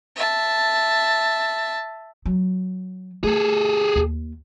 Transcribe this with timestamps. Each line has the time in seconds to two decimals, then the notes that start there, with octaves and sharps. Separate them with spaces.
0.16 E5 A5
2.26 F#3
3.24 A3 G#4 A4
3.96 D#2